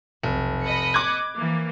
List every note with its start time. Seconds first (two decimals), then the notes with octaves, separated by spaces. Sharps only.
0.23 F1 B1
0.62 D#5 B5 C#7
0.94 D6 F#6 G#6
1.35 E3 F3 A#3